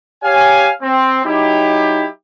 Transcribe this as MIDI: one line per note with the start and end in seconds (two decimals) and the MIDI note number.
0.23 0.70 67
0.23 0.70 73
0.23 0.70 77
0.23 0.70 80
0.81 1.20 60
1.25 2.06 54
1.25 2.06 63
1.25 2.06 64
1.25 2.06 67